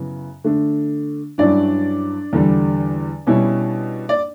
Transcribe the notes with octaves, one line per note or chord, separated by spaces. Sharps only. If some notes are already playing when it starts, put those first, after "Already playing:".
Already playing: F#2 C#3 B3 E4
D3 A3 D4
G2 F#3 C#4 D4 E4 D5
E2 D3 G3
B2 G3 C#4 E4
D5